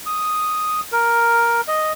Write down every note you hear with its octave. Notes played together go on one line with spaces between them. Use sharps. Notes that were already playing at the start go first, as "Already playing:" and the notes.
D#6
A#4
D#5